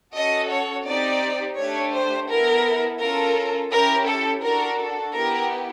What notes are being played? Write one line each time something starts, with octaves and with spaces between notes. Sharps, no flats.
C#4 F#4 A4 D#5
C#5
C4 D#4 G4 D5
A3 D4 G4 C#5
C5
B3 E4 A4 A#4
C#4 F4 A4 A#4
C#4 E4 G4 A#4
A4
D4 F#4 A4 A#4
A4
B3 E4 G4 A#4